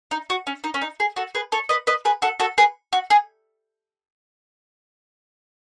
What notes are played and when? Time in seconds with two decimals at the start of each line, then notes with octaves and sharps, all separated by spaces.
0.11 D#4
0.30 F#4
0.47 C#4
0.64 D#4
0.74 C#4
0.82 D#4
1.00 G#4
1.16 F#4 A4
1.35 G#4 B4
1.52 A4 C#5
1.69 B4 D#5
1.87 B4 D#5
2.05 G#4 B4
2.22 F#4 A4
2.40 F#4 A4
2.58 G#4 B4
2.93 F#4
3.10 G#4